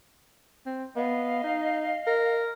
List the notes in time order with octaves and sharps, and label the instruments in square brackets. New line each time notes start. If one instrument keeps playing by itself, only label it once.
[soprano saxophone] C4
[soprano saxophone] B3 [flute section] D#5 F5
[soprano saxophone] D#4
A#4